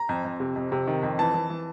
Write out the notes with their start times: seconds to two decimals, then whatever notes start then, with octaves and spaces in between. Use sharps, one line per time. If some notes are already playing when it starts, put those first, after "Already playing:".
Already playing: A#5
0.09 F2
0.25 F2
0.40 C3
0.56 F2
0.72 C3
0.88 D#3
1.03 F2
1.19 E3 A5
1.34 E3
1.50 E3